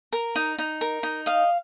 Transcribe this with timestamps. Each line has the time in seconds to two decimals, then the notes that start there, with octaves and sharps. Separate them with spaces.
0.13 A#4
0.35 D#4
0.58 D#4
0.81 A#4
1.03 D#4
1.26 D#5 F5